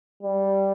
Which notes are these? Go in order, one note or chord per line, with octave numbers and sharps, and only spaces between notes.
G3